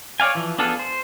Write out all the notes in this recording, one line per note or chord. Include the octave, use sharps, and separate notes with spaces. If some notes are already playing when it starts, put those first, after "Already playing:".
C#5 D5 F5 G#5
E3 F3
B3 D4 F4 G#4 A4
C5